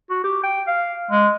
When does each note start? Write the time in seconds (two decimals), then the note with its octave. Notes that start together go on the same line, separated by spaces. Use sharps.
0.10 F#4
0.24 G4
0.43 G5
0.68 F5
1.11 G#3